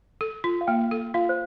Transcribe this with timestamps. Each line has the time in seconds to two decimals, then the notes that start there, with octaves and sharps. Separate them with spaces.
0.21 A4
0.44 F4
0.61 F5
0.67 A#3 G5
0.91 A4
1.14 F4 F5
1.29 C5